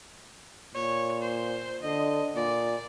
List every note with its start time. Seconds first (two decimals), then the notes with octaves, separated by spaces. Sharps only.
0.75 A#2 C#5
1.22 C5
1.82 D3 D#5
2.36 A#2 D5